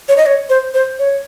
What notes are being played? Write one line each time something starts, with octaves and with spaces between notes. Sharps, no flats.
C#5
D#5
C#5
C5
C5
C#5